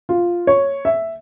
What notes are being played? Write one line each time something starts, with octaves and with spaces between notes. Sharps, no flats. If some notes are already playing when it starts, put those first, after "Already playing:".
F4
C#5
E5